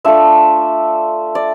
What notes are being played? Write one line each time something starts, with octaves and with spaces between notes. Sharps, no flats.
A3 D4 F4 E5
D5